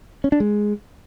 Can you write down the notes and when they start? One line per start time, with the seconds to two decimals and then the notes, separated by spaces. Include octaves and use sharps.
0.24 C#4
0.32 D4
0.40 G#3